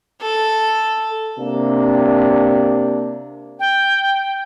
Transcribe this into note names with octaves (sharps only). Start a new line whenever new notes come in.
A4
C3 A#3 D4
G5